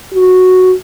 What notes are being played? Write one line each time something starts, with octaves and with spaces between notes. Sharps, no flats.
F#4